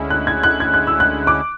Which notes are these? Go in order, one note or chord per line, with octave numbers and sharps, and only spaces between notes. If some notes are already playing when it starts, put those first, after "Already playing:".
Already playing: D2 D3 G#3 C#4 E4
F#6
G#6
F#6
G#6
F#6
E6
F#6
D6